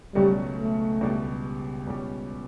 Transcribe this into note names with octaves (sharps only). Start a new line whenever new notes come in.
C#2 B2 F#3 G3 A3 C#4
A3
C#2 B2 G3 D4 G4
C#2 B2 G3 C#4 G4